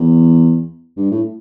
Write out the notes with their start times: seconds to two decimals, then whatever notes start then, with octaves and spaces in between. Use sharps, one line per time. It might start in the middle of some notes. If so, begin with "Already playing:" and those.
Already playing: E2
0.97 G2
1.11 A2